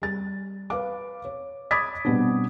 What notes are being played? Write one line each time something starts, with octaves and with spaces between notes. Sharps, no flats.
G3 A6
B4 F5 D6
C#5
B5 D6 D#6 G#6 A6 B6
B2 G3 B3 C4 D4